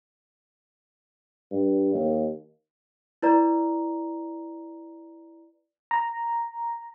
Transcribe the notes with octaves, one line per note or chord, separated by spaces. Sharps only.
G2
D#2
E4 B4 D5 A#5
A#5